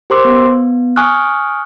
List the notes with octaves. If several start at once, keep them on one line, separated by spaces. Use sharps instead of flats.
G4 A#4 C5 C6 D6 E6
B3
G#5 C#6 D#6 F6 F#6